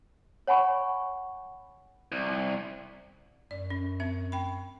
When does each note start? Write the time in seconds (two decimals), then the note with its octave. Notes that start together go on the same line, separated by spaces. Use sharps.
0.47 C#5 F#5 G#5 B5 C#6
2.12 C2
3.51 F#2 D5
3.70 C#4
4.00 C4 E5
4.32 G5 B5